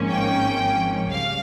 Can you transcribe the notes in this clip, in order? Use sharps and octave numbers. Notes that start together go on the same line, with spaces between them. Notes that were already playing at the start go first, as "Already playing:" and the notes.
Already playing: G#1 G#2 F3 A#3 C#4
G5
C#2 C#3 G3 F5